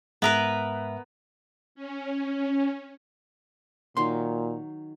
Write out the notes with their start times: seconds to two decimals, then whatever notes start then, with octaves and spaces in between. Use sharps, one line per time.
0.22 G#2 B3 A#4 B4 E5
1.75 C#4
3.97 A#2 D#3 F#3 C6